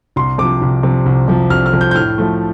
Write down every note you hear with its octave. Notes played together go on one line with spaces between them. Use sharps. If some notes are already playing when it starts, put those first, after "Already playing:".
C2 C6
C3 F3 D6
C2
C3 F3
C2
C3 F3
C2 F6
F6
C3 F3
G6
G6
A2 F6
F3 A3